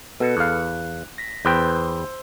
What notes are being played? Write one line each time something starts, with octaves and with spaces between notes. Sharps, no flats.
B2 A4 B4 C#7
E2 F5 F#6
A#6 B6
E2 B4 C5 G5 C6 E6